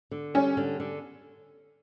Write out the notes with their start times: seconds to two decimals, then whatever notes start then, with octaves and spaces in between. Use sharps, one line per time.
0.11 D3
0.34 G3 C#4
0.57 D3
0.80 D3